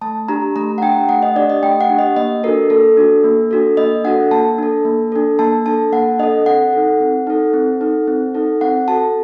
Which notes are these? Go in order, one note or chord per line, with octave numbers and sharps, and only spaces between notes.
A3 A5
D4 G4 A#5
A3 A#5
F#5
D4 G4 G5
A3 F#5
D#5
D4 G4 D5
D#5
A3 G5
F#5
D4 G4
D#5
A#3 D#5
D4 F#4 A4 A#4
A#3 A4
D4 F#4 A4
A#3
D4 F#4 A4
A#3 D#5
D4 F#4 A4 F#5
A#3 A5
D4 A4
A#3
D4 A4
A#3 A5
D4 A4 A5
A#3 F#5
D4 A4 D#5
C4 F#5
D#4 A4
C4
D#4 A4
C4
D#4 A4
C4
D#4 A4
C4 F#5
F#4 A4 A5